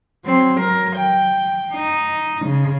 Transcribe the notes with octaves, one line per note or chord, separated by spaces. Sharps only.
F#3 C4
F#3 A#4
G5
D#4
C#3